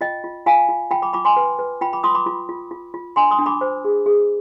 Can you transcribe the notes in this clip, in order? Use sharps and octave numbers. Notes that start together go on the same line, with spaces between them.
F4 D#5 G5
F4
F4 F5 G#5
F4
F4 G5 B5
B5 D6
F4 B5 D6
G#5 C6
B4
B4
F4 G5 B5
B5 D6
F4 C6 D#6
B5 D6
F4
F4
F4
F4
D4 G#5 C6
C6 D#6
D4
B5 D6
C5
G#4
G#4